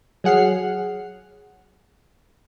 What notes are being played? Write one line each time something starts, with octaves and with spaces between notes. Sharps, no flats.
F#3 G#4 F#5 F6 C7